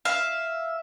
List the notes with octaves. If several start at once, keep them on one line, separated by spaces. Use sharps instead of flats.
E5 F5